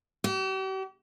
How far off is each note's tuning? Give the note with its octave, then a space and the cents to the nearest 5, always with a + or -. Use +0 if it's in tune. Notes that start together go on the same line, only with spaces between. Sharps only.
G4 -45